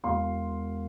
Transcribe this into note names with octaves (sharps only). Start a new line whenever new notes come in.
E1 F5 C6